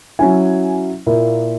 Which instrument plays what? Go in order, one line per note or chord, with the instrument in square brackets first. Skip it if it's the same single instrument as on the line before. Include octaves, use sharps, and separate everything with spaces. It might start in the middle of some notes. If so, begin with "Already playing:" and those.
[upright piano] F#3 C#4 E4 G#5
A#2 A#3 E4